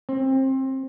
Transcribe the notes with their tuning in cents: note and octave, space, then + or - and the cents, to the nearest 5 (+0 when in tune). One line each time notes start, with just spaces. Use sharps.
C4 +25